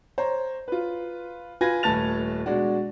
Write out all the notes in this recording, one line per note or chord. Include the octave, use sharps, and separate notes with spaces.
C5 C#5 A#5
F4 B4
F4 B4 G#5 G#6 A#6
D#1 A3 B4 A5 A6 F7
B2 G#3 D4 F#4